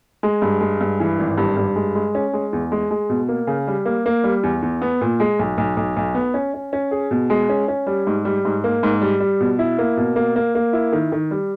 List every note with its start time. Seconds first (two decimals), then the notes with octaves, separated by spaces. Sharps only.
0.23 G#3
0.42 G2
0.61 G#3
0.81 G2
1.00 E3
1.19 G#1
1.38 G2
1.57 G2
1.76 G#3
1.95 G#3
2.15 C#4
2.33 G#3
2.53 E2
2.72 G#3
2.91 G#3
3.10 B2
3.29 A#3
3.47 C#3
3.67 G3
3.86 A#3
4.06 A#3
4.24 G3
4.43 E2
4.62 E2
4.82 B3
5.01 A#2
5.20 G#3
5.39 B1
5.58 B1
5.77 B1
5.97 B1
6.15 B3
6.34 C#4
6.54 C#4
6.73 C#4
6.91 G#4
7.11 B2
7.30 G#3
7.49 C#4
7.68 C#4
7.87 G3
8.07 G#2
8.25 G3
8.45 G#2
8.64 A#3
8.83 G#2
9.02 G3
9.20 G3
9.40 B2
9.59 E4
9.78 A#3
9.97 B2
10.16 A#3
10.36 A#3
10.55 A#3
10.73 E4
10.93 D#3
11.12 D#3
11.31 G3